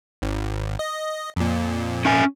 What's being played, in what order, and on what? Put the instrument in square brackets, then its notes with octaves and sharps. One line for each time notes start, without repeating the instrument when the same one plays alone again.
[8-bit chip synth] G#1
D#5
F2 A#2
[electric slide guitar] C#4 E5 G#5